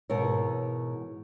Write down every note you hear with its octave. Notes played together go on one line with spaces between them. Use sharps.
G#2 B2 E3 A#4 C#5